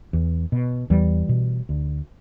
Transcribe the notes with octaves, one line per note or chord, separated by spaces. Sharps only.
E2
B2
E2 E3 G3
B2
D2